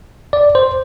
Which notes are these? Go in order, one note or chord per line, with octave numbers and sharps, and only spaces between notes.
D5
C5